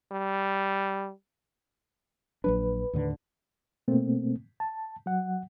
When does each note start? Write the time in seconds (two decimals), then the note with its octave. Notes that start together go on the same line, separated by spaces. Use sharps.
0.12 G3
2.44 A#1 F#3 D4 B4
2.93 D#2 A2 D3
3.88 B2 A3 A#3 C4
4.60 A5
5.06 F#3 F#5